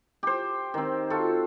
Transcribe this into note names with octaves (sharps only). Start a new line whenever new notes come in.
G4 C5
D#3 C4
F4 F#4 A4